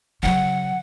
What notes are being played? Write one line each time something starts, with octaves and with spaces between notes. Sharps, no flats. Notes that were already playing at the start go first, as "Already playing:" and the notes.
C#3 F#3 F#5